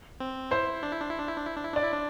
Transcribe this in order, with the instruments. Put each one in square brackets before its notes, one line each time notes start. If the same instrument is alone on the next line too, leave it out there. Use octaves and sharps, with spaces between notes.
[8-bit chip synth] C4
[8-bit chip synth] E4 [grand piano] C5
[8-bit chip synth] D4
E4
D4
E4
D4
E4
D4
E4
D4
E4
[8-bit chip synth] D4 [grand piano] D5
[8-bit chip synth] E4
D4